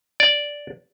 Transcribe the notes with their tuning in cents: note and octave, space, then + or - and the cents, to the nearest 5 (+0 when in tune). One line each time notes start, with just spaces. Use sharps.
D5 -5